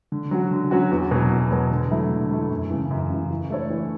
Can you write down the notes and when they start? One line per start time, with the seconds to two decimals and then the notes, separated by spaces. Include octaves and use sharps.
0.12 D3
0.31 F#3 C#4 F#4
0.51 D3
0.71 F#3 C#4 F#4
0.91 E2
1.11 B2 F#3
1.31 E2
1.51 B2 F#3
1.71 D3
1.91 F#3 A3 E4
2.11 D3
2.31 F#3 A3 E4
2.50 F#2
2.71 C#3 E3
2.91 F#2
3.10 C#3 E3
3.31 E3
3.50 A3 D4 A4 C#5
3.70 E3